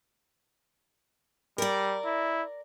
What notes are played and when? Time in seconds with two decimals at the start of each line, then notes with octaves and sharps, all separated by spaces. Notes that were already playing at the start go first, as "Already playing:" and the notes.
1.58 G3 A#4 D5
2.05 E4